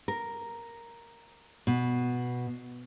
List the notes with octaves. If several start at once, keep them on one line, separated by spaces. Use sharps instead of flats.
A#4
B2